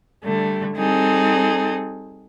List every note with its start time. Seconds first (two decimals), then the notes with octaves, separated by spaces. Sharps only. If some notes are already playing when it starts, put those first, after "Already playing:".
0.24 D3 G3 A3
0.76 G3 C4 D#4 G#4 A4